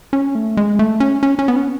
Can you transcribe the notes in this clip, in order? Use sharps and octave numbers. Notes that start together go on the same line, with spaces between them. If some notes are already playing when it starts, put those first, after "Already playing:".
C#4
A3
G#3
A3
C#4
C#4
C#4
B3
C#4